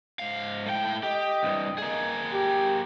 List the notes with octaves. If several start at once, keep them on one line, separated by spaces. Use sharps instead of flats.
G#2 F5
A2 G5
G4 D#5
C2 G2
A#3 G#4
G4